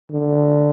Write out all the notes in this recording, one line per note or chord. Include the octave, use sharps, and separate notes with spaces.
D3